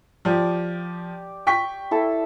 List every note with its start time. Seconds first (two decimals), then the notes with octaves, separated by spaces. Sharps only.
0.25 F3 G4 D5
1.47 G5 C#6 B6
1.91 E4 A4